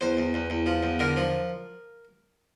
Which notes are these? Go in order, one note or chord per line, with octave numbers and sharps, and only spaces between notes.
E2 C5
E2
E2
E2
F3
E2
D3 A#4
F3